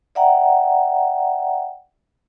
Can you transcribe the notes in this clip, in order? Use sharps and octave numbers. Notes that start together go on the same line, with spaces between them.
D5 E5 F#5 G5 A#5